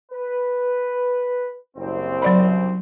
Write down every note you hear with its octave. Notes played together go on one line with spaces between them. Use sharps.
B4
F#1 C2 C4
F#3 D5 B5